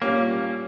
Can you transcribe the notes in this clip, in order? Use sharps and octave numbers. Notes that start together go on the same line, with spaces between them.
A#2 G3 A#3 C#4